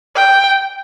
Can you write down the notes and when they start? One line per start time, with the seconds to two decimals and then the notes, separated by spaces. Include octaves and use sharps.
0.17 G5